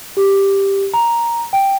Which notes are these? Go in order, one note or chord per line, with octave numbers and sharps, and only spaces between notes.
G4
A#5
G5